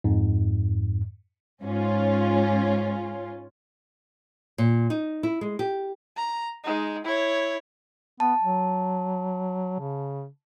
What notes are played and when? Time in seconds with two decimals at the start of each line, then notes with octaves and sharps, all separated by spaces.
0.04 F2 G#2
1.62 G#2 C#4 F4
4.58 A#2
4.90 D#4
5.23 E4
5.41 G#3
5.59 G4
6.17 A#5
6.64 G#3 D#4
7.04 E4 C#5
8.20 B3 A5
8.42 F#3
9.80 C#3